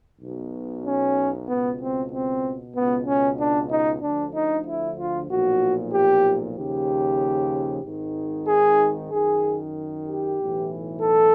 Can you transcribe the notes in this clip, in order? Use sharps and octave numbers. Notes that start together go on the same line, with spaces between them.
B1 B2
C#4
C#2 B2 B3
C4
C4
C#2 B2 B3
C#4
D4
D#4
D2 D3 F3 D4
D#4
E4
F4
B1 A#2 F3 F#4
G4
D#2 C#3 F3 G4
G#1 G#2 D#3
G#4
F#2 D#3 G#4
G4
B1 A2 E3
A4